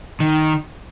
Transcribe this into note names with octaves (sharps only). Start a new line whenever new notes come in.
D#3